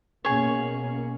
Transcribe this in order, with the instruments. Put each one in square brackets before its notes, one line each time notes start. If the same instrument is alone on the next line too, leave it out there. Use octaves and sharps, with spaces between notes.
[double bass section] B2 A#3 C#4 [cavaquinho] G#4 C#5